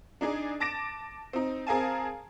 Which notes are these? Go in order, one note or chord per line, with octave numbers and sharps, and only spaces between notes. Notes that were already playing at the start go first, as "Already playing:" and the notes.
D4 D#4 G#4 D5
A5 D6 A6 A#6 D7 E7
C4 D#4
C4 G#4 A#4 F5 G#5 A5